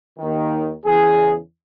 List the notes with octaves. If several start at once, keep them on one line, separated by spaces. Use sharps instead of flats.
D#2 D#3
E2 C#3 E3 G#4